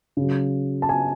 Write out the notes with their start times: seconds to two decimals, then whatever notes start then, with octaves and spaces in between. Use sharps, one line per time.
0.17 C#3 F#3
0.82 A5
0.89 G#5